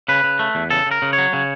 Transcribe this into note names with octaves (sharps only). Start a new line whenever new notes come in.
C#3 B4
C#3
A3
E2
C#3 A4
C#3
A#4
C#3
C#5
F#3
C#3